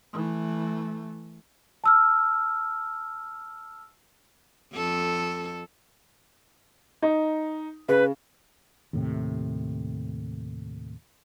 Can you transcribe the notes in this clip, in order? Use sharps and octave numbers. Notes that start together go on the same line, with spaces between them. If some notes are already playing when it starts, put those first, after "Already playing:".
E3 A3
A5 E6 F6
F2 A4
D#4
C#3 B4
D#2 A2 C3